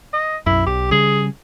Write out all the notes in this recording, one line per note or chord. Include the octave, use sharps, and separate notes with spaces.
D#5
B1 F#2 E4
B1 G4
C#3 G3 G#4